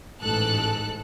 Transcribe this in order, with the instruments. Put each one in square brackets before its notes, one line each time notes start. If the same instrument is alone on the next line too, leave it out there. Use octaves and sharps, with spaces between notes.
[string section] A1 G#2 A4 F#6